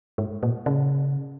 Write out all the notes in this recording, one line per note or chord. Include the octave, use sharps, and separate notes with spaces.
G#2
A#2
C#3